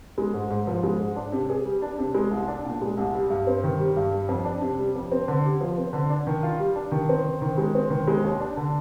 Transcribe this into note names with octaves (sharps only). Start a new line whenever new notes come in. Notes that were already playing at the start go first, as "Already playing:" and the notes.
G#3
G#2
G#2
F3
G#3
G#2
D4
C3
G#4
G3
D4
C3
G#3
C2
D4
A#2
G#3
C2
G3
G2
C4
D#3
G3
G2
G3
F2
D4
C3
G3
F2
C4
D3
G4
F3
C4
D3
D4
D#3
F4
G3
D4
D#3
C4
D#3
D#3
G#3
C4
D#3
G#3
D#2
D4
D3